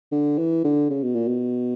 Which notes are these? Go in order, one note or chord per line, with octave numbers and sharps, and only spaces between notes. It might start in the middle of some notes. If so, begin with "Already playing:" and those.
D3
E3
D3
C#3
B2
A#2
B2